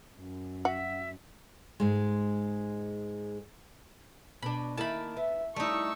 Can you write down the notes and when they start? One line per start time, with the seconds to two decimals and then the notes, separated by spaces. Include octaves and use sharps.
0.19 F#2
0.65 F#4 E5
1.80 G#2 G#3
4.42 B2 D4 B5
4.77 D#3 A#3 E4 A5 B5
5.17 B3 E5
5.56 G3 A3 D#4 E4 C#6 E6